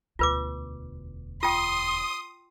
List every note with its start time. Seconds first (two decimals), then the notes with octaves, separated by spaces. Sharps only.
0.19 E1 D2 F4 B4 D6
1.43 F4 G5 C6 D#6